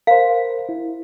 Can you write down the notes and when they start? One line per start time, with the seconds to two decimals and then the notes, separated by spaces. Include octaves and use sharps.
0.07 A#4 C5 F5
0.69 E4